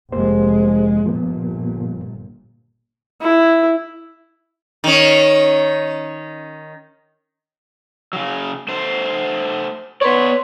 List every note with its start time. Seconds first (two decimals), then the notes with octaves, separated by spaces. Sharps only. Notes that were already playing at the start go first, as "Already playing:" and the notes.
0.12 F1 G#3 A#3 G4 C5
1.06 G1 A#2 F3 A#3 B3
3.22 E4
4.84 D#3 C#4
8.13 C#3 F#3
8.68 A3 C5
10.02 B3 B4 C#5 D5 C6